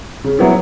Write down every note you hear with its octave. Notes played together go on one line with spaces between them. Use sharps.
C#3
F#3 B3 E4